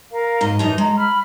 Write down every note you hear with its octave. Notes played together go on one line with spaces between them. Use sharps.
A#4 F5
G#2 D#5
F#2 E3 D#4 A5 A#5
G#3 A#5
B5 F6